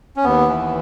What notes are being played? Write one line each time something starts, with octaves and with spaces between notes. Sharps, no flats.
C#4
D#2 B3
E3